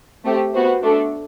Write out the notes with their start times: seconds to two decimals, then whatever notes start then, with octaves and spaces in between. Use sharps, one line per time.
0.24 A3 C4 G4
0.54 B3 F#4 C5
0.82 A3 D4 A4